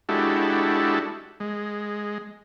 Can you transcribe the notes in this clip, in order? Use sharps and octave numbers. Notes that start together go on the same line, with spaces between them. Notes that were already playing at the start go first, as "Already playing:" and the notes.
G#3 D4 E4 F#4 G4 A4
G#3